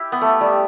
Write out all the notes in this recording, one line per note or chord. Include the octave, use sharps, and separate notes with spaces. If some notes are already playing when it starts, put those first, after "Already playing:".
Already playing: E4 G4
B3
A3
G3